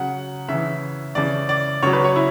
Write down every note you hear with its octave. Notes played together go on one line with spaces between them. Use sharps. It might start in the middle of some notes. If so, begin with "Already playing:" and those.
Already playing: C#3 F#3 F#5
C#3 E3 E5
C#3 E3 D5
D5
C#3 F#3 C#5
B4
C#5
E4